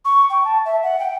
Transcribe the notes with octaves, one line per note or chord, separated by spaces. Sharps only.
C#6
G5
A5
E5
F#5
G5